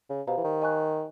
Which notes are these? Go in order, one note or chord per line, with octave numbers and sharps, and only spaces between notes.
C#3
B2 G4 C5 F5 A#5
E3
D#3
D#5 G#5 C#6 F#6